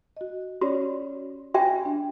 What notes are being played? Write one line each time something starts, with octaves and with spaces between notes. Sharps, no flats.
F#4 D#5
C#4 F#4 C#5 D5
F#4 E5 G5 G#5
D4